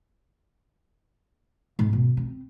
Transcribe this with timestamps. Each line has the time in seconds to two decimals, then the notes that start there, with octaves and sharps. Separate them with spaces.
1.79 G#2
1.93 B2
2.17 C4